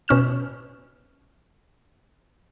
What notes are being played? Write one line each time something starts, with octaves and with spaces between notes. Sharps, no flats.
B2 C#4 F6 E7